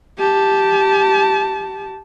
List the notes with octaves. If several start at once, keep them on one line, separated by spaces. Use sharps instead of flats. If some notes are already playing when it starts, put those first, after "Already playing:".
G4 A5